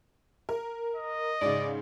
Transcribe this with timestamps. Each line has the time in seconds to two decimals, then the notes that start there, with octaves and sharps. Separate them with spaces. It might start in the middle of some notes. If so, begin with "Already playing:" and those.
0.49 A#4
0.96 D#5
1.41 G#2 C#3 D5